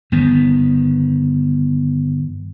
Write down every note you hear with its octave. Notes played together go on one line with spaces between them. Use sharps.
G1 D#3 B3